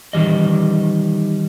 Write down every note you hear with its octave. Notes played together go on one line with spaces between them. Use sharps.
D#3 E3 G3 D#5